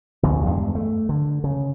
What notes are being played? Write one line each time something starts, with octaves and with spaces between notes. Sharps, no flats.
A1 D2 B2
E2 G2 G#3
A3
D3
C#3